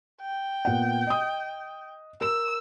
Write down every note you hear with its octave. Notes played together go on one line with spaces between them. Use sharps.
G5
A#2 B3 F#5
D#5 D#6
A#4 E6 E7